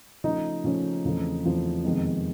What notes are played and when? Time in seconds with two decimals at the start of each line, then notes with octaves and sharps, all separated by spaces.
0.24 C#3 F3 A3 C#4 D#4 D#5
0.64 C#3 F3 A3 C#4
1.04 E2 C#3 F3 A3 C4
1.44 E2 C#3 F3 A3 C4
1.85 F2 C3 D#3 G#3 B3